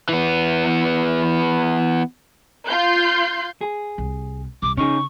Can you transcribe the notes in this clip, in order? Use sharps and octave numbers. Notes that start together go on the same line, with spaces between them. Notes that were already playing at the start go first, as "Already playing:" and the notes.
E3 B3
F4 C6 G6
G#4
C2
C2 D6
C#3 C#4 D#4 G#4 C#6